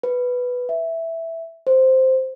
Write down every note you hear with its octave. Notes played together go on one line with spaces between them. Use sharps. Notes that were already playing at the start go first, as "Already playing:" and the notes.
B4
E5
C5